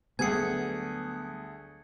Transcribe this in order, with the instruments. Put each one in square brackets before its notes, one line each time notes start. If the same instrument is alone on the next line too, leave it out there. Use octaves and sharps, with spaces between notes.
[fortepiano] D2 G#4 G#5 [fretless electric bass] F#3 G3 B3 [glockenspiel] G#6 C#7